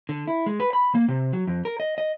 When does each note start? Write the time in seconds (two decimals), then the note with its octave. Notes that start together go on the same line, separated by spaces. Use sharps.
0.09 D3
0.28 E4
0.46 G#3
0.60 B4
0.73 B5
0.95 A#3
1.08 C3
1.33 F#3
1.47 F2
1.65 A#4
1.80 D#5
1.98 D#5